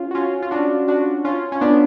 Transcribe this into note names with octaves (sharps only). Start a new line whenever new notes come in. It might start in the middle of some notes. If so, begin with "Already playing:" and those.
Already playing: C#4 F4
F#4
C#4 F4
F4
D4 F#4
D4 F#4
C#4 F4
C#4
B3 D4